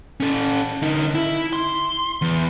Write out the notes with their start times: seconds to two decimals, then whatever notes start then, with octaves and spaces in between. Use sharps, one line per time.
0.20 C#4 A4
0.82 D3 D#4
1.15 E4
1.53 C6
2.22 E2